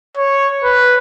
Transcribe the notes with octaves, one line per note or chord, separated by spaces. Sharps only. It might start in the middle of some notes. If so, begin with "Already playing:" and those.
C#5
B4